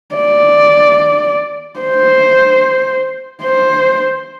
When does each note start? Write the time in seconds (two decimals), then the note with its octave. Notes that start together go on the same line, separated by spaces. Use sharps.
0.16 D5
1.79 C5
3.43 C5